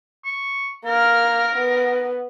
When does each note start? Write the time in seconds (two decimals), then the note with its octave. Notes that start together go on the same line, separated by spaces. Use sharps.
0.25 C#6
0.86 A#3 A#4 F6
1.56 B3